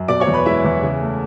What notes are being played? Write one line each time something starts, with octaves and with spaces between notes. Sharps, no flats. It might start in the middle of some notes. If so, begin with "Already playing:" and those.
Already playing: F#2
B2 D5 D6
C#5 C#6
E2
B4 B5
G#3 E4 E5
E2
C#3
A3